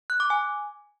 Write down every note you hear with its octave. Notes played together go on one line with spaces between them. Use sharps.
F#6
D6
G#5